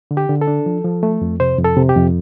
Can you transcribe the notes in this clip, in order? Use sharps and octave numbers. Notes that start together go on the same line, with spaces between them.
D3
G4
D3
A4
D4
F3
F3
A3
F2
C3 C5
F2
A4
C3
G4
F2